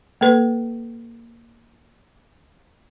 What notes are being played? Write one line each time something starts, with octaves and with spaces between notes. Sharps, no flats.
A#3 A4 B4